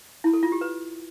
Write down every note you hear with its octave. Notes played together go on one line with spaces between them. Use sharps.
E4
A4
F4
G4
B4